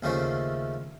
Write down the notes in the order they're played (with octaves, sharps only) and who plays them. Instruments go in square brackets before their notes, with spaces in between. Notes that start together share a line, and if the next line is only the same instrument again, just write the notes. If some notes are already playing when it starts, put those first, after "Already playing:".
[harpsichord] D#2 C#3 F3 A3